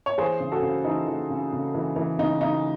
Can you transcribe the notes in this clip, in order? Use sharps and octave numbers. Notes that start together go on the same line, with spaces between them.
C#5
E3 G#4 C5
C#3
F#4 A4
C#3
E3 D#4
E3
C#3
C#3
E3
E3
C#3 D#4
C#3 D#4